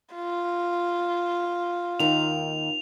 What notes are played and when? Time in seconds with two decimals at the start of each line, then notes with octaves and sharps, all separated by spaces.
0.14 F4
1.99 D#2 D#3 F7